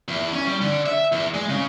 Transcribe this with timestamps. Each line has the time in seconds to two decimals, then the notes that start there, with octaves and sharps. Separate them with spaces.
0.08 E2
0.33 C#4
0.46 G3
0.61 D3
0.86 E5
1.12 E2
1.34 G#3
1.49 C#3